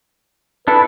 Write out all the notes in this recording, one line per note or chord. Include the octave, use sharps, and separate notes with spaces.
D4 E4 A4 B4